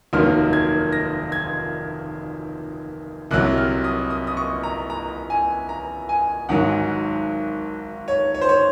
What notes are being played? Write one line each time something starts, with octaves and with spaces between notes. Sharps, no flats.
F1 D#2 D#3 F#3 F6
G#6
A#6
G#6
C2 C3 F#3 F#6
F6
D#6
D#6
D#6
C#6
A#5
A#5
G#5
A#5
G#5
G#1 G#2 F#3 F#5
C#5
C#5
C5
C#5